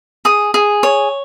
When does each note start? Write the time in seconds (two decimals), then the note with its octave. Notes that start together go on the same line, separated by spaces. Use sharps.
0.25 G#4 D#6
0.54 G#4
0.83 C#5